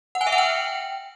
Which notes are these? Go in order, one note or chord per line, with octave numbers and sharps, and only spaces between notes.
F#5
G#5
E5
F#5
G5